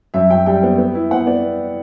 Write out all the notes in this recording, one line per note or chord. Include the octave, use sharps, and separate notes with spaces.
F#2 E5
F#2 G5
G3 G5
B3
B3
E4
B3 F#5
B3 D5